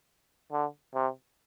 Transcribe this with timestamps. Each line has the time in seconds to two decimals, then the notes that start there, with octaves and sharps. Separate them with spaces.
0.52 D3
0.95 C3